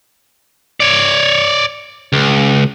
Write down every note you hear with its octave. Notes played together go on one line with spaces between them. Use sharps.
C#5 D5
C#2